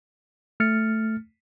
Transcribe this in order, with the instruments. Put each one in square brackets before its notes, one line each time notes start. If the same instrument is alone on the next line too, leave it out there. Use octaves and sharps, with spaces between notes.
[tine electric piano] A3 F6 A6 C#7